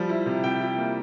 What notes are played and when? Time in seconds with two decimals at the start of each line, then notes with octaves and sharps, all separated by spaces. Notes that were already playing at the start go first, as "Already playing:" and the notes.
Already playing: F3 G3
0.09 E4
0.26 C3
0.43 C3 G5
0.61 E4
0.78 A#3